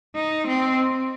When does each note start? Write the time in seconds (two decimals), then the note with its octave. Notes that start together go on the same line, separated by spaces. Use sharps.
0.15 D#4
0.47 C4